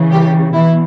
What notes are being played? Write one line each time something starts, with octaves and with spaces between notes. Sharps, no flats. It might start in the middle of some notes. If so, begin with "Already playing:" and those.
Already playing: C#3 E3
G3 G4
B2 E3 E4